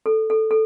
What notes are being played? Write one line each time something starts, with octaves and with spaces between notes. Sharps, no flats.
A4
A4
A4